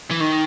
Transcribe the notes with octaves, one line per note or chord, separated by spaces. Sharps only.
E3
D#3